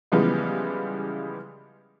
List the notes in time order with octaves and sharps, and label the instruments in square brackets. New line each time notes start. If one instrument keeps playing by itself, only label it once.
[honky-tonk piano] C#3 E3 F3 G3 G#3 B3